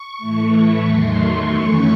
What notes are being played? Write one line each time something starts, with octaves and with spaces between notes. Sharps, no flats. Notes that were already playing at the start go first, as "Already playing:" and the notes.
Already playing: C#6
A2 E3 A3
E2 D#3 F#3 A3 C6
C#6
F#2 E3 A3 C#4